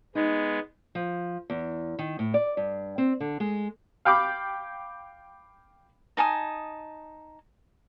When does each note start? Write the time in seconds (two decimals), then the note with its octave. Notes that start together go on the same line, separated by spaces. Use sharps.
0.15 G#3 B3 D#4
0.95 F3
1.50 E2
1.99 D#3
2.19 A2
2.34 D5
2.57 G2
2.98 C4
3.20 D3
3.40 G#3
4.05 F5 G5 B5 D6
6.17 D#4 G#5 A5 D#6